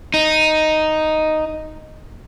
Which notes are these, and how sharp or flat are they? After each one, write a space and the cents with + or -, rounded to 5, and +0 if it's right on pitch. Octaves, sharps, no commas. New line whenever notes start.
D#4 +0